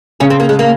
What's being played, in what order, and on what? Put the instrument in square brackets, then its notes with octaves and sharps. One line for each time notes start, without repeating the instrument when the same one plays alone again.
[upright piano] C#3 [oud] C#4
[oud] C4
A#3
G#3
A#3